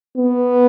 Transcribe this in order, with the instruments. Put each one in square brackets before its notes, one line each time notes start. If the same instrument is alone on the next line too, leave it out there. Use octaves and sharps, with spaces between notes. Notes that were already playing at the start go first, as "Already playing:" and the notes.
[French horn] B3